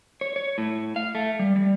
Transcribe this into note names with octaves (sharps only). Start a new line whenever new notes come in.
C#5
C#5
A2
F5
A3
G3
G3